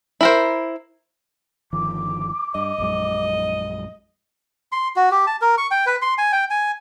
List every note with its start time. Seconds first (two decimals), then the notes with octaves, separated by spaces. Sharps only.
0.21 E4 A#4 C5
1.73 G1 D#3 F3 D6
2.55 G2 D#5
2.78 A#1 F#2 G#3
4.72 C6
4.96 F#4
5.11 G4
5.27 A5
5.42 A#4
5.58 C#6
5.71 G5
5.86 B4
6.02 C6
6.18 G#5
6.32 G5
6.50 G#5